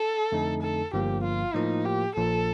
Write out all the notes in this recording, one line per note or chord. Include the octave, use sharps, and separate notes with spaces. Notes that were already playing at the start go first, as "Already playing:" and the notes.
Already playing: A4
F2 D3 A3 D#4
A4
G1 G2 F3 A#3 G4
F4
A2 F3 A#3 D#4 F4
G4
A#1 A#2 F3 A4